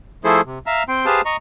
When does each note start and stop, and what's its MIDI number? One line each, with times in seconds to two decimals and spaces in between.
0.24 0.41 53
0.24 0.41 57
0.24 0.41 64
0.24 0.41 68
0.24 0.41 69
0.24 0.41 72
0.45 0.59 48
0.67 0.83 76
0.67 0.83 77
0.67 0.83 82
0.89 1.06 60
0.89 1.06 79
0.89 1.06 84
1.06 1.21 67
1.06 1.21 68
1.06 1.21 71
1.06 1.21 72
1.06 1.21 77
1.06 1.21 81
1.25 1.37 75
1.25 1.37 82
1.25 1.37 85